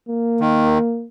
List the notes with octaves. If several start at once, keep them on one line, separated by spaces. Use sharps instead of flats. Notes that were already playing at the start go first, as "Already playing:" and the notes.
A#3
D#3